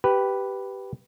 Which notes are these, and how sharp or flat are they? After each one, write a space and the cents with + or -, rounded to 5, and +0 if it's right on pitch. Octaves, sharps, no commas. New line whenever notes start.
G4 -10 B4 +0